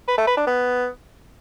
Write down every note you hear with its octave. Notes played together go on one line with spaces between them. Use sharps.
B4
A3
B4
D4
B3